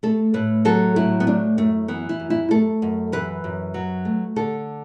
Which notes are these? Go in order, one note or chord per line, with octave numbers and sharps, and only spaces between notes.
A3 A4
A2 B4
F#3 A4
A2 E4
B3
A3 D4
F#2 A3
E3 B3
E4
F#2
E4
A3 A4
F#2
E3 B4
F#2
F#3
A3
D3 A4